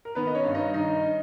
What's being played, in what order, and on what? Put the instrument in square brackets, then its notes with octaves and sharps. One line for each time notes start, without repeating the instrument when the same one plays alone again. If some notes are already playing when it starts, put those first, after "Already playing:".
[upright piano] A#4
D#3 B3 B4
D#5
C#4 C#5
G2
D#4 D#5
D#3 D#4 D#5